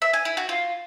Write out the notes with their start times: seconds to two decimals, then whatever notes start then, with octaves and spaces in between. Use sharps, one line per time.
0.02 E5
0.13 G#5
0.25 E4
0.37 F#4
0.49 F4